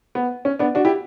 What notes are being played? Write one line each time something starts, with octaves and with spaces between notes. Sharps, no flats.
B3
C#4
B3 D4
D4 F#4
E4 G4